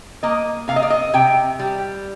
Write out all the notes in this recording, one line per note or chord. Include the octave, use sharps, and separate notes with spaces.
A#3 D#5
C3 F5
D#5
D5
D#5
C3 G5
G3